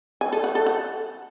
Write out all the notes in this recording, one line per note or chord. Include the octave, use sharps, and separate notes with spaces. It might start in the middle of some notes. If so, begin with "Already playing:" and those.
G#5
A4
F#5
A4
F#5